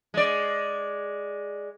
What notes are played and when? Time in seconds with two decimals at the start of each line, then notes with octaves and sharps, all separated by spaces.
0.14 G#3 D5